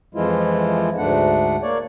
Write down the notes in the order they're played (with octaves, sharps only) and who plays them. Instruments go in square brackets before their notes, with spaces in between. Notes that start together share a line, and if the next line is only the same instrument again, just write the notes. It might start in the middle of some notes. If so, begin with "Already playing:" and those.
[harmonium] F2 E3 F3 G#3 E4 F4
D2 G#2 A3 D4 F#5
A#3 C#5 D5